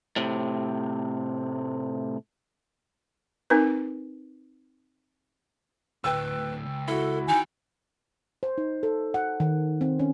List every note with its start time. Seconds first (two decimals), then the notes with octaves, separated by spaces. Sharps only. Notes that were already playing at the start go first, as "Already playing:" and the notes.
0.16 A2 C3
3.50 C4 D#4 A#4 B4
6.04 D2 A2 B4 G5 E6
6.65 C#2
6.88 E4 F#4 A4
7.28 D#2 D#4 G5 G#5
8.43 C5
8.58 D#4
8.83 A4
9.14 F#5
9.40 D#3
9.81 C4
9.99 C#4